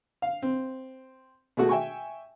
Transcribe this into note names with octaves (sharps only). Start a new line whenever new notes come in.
F5
C4
B2 G#3 A3 F#4
E5 G5 G#5 C#6